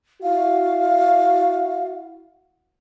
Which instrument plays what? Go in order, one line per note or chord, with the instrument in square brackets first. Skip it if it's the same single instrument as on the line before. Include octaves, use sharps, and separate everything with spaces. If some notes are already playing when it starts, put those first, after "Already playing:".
[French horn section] E4 F#4 [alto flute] F5